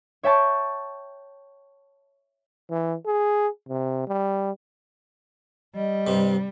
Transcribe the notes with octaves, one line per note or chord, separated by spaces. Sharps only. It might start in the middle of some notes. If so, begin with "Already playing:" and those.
C#5 E5 G5 A5 C#6
E3
G#4
C3
G3
G3 D#5
G2 C3